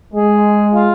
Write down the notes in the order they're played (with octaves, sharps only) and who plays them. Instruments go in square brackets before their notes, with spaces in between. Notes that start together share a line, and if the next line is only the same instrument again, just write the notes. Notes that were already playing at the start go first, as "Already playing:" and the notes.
[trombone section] G#3 [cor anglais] G#4
[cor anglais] F4